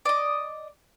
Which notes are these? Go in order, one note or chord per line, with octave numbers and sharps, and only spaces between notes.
D5 D#5